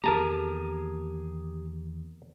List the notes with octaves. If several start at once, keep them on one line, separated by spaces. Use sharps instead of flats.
E2 D#3 A#3 G4 G#4 A#4 A5 A#5